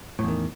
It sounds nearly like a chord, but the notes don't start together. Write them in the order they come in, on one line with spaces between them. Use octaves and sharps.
A2 E2 D#3